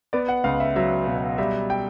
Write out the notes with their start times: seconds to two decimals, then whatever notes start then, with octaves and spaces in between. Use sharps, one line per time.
0.13 B3 D5
0.28 F#5
0.44 C#2 F5
0.60 E5
0.76 F#3 E5
1.07 B2
1.38 G3 E5
1.70 G5